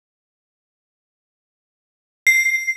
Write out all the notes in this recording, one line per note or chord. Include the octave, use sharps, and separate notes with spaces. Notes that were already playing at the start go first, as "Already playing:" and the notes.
C7